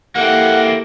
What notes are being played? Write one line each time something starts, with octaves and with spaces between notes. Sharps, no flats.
A#3 C4 E4 G4 A4 F#5